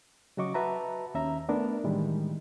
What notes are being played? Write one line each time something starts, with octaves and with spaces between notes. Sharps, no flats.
C#3 F#3 F#4 D#5 C#6 D6
F#4 B4 E5 A5 A#5
D#2 C#4 E5 A#5
A3 B3 D4 A#4
A2 D#3 E3 G3 G#3